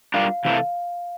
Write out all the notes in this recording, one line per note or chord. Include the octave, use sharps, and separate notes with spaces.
G3 D4 F4 A#4 F5
C3 E3 A3 E4 A4 F5